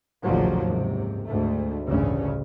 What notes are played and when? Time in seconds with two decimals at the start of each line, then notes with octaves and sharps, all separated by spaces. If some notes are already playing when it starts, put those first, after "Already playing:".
0.24 A1 D#2 A#2 C#3 F3 F#3
0.65 F#1 G#2 C3
1.26 D2 G#2 A3
1.87 A1 D2 G2 C#3 C#4